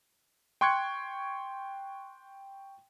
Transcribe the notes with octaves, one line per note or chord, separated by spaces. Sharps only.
G5 C6 C#6 F#6 G#6 C#7